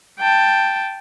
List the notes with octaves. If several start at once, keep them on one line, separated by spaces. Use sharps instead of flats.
G5 A5